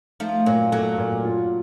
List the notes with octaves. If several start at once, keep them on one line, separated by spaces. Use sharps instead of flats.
F3 A3 D#4
A#2 F#3 A#3
F#3 A3 A#3
A#2
F4